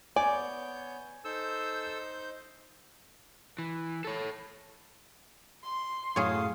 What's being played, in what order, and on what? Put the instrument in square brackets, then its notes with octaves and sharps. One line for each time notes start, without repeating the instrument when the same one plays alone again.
[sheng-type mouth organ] B3 C#5 G6 [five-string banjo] D5 [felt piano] G#5
[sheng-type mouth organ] D#4 C5 G6 [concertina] A4 E6
[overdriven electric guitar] E3
A4 C#5
[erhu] C6
[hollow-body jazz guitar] F#2 A2 [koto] G#4 C#5 [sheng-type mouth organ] F5 D#6